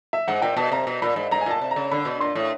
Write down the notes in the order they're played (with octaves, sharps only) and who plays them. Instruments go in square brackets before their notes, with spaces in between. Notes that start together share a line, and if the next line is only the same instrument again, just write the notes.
[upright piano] E5
[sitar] G#2 [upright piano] F#5
[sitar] A#2 [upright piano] G5
[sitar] B2 [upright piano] A5
[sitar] C3 [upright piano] A#5
[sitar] B2
[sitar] A#2 [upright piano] B5
[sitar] G#2
[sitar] G#2 [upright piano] A#5
[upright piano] G#5
[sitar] A#2 [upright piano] A5
[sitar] C3
[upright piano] A#5
[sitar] C#3
[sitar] D3 [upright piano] B5
[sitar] B2
[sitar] A#2 [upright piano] C6
[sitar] A2